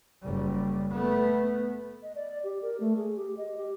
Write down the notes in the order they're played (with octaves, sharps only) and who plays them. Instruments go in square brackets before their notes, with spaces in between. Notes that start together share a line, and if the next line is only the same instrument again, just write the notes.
[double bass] F#1 G3
A3 B3
[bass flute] D#5
D5
G4
A#4
A3
G#4
G4
D#5
G4